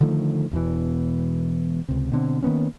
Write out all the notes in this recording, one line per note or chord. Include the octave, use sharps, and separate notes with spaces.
D3 D#3 F3 A3
E1 E2 B2 E3
C#2 C3
B2 D3 C4
D#3 A#3 B3 C#4